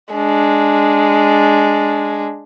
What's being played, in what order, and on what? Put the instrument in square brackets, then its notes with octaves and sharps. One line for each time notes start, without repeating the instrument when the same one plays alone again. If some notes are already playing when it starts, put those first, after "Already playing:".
[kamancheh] G#3 D4